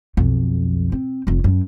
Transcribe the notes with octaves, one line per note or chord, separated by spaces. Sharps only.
B1 F2
C4
F1 F2
F#2